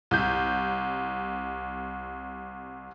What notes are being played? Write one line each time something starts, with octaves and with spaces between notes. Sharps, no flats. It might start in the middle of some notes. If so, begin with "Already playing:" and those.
C2 G6